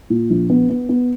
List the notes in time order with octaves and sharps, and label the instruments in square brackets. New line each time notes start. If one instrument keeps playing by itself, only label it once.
[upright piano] A#2
A#1
B3
B3
B3